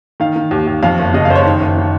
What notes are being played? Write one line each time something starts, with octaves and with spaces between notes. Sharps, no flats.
D#3 F5
D#3
D#2
D#2
F2 F5
F#1
C#3 D#5
F5
F#1 C5
C#5
D#3
F#1
D#3